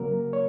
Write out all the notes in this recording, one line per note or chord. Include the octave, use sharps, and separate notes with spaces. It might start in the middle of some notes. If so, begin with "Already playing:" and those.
Already playing: C#3 F#3 A#3 A#4
C#5